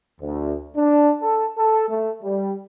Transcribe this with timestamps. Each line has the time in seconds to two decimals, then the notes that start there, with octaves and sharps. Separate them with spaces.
0.21 D2
0.76 D4
1.21 A4
1.58 A4
1.89 A3
2.23 G3